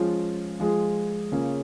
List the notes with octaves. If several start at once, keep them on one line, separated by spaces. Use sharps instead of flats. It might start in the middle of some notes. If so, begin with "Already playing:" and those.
Already playing: F3 G#3 C#4 F4
F3 G#3 F4 G#4
C#3 A#3 C#4 F4 G#4